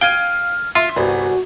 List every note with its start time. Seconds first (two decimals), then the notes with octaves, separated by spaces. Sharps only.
0.01 F5 G5 F6 G#6 D#7
0.75 F4 E5 C6
0.96 G1 C2 F#4 B4 G#5